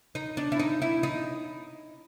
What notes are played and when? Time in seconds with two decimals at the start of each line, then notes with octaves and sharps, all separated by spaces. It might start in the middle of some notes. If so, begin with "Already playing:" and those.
0.15 D#4
0.37 D4
0.52 E4
0.60 D#4
0.82 E4
1.03 D#4